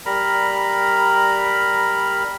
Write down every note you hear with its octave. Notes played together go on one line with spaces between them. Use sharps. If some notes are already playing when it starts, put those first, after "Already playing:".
G3 A#4 A#5 B5